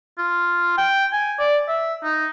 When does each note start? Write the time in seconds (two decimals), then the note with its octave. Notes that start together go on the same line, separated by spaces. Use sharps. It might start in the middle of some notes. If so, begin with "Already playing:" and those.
0.18 F4
0.77 G5
1.13 G#5
1.39 D5
1.68 E5
2.03 D#4